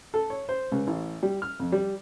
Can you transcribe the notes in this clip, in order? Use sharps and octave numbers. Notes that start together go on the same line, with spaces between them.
A4
C#5
C5
C#2
A1
G3
F6
F2
G3